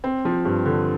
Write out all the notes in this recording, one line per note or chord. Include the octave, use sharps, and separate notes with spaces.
C4
F3
G2
D3